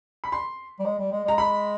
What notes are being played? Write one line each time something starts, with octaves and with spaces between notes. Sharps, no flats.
B5
C6
G3
G#3
G3
G#3
G#3 A#5
B5